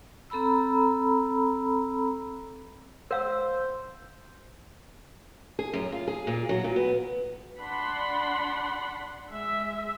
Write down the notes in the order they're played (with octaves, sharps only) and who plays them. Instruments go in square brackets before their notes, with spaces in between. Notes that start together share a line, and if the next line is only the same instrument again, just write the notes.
[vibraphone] C4 A4 A#5 B5 E6
[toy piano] A#4 F5 E6 [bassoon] C5
[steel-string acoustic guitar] G#4
F#2
F4
G#4
A#2
F#3
A#2
B3
[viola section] D4 F#5 B5 C6
G#3 E5